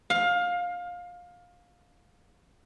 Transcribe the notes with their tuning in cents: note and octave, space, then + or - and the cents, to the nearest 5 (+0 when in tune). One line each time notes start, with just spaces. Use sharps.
F5 +20